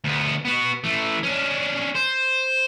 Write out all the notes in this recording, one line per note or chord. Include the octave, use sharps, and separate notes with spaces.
D2 B3
B3 F#4
E3 A3
C#4 D4
C5